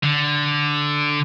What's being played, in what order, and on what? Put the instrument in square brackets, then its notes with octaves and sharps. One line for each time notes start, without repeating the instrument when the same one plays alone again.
[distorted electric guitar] D3